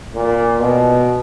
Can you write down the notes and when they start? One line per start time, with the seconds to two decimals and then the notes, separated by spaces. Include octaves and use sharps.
0.15 A#2
0.61 B2